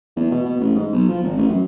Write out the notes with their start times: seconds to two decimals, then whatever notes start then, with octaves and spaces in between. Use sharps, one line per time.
0.16 E2
0.31 B2
0.45 B2
0.60 A1
0.75 G#2
0.93 B1
1.09 F3
1.23 G#1
1.37 A1
1.48 F#2